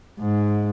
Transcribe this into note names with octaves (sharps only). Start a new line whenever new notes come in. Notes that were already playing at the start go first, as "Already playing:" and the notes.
G#2